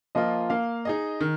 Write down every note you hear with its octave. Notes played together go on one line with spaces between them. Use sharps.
F3 A#3 F4 D#5
A#3 F5
D#4 G#4 D#5
D#3